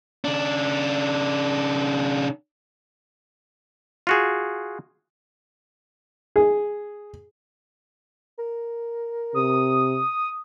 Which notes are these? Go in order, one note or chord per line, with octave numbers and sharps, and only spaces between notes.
C#3 D4
F4 F#4 G#4
G#4
A#4
C3 D#6